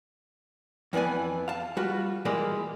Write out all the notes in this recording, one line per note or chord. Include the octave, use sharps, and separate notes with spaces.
F2 E3 B3 D5 G#5
F5 A5
G3 F4 F#4
A#2 E3 G3 G#3 A#3